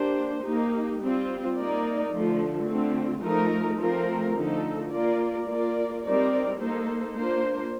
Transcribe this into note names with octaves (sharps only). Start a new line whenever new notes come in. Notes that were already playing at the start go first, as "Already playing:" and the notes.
Already playing: A#3 D4 G4 C5
A#3 D#4 G4
G3 C4 F4
A#3 D#4 A#4 D5
D3 F3 A3
D3 A3 C4 F4
F3 A3 D#4 A#4
F3 A3 C4 F4 A#4
D3 F3 A3 D#4 A4
A#3 F4 A#4 D5
A#3 F4 A#4 D5
G3 C4 D#4 A#4 D5
A#3 D#4 A4 C5
A#3 D4 F4 C5